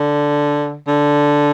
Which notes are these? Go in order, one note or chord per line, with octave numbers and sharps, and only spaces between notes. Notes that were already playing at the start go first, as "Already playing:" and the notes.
Already playing: D3
D3